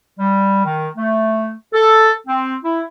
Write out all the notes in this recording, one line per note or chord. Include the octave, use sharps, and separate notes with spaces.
G3
D#3
A3
A4
C4
E4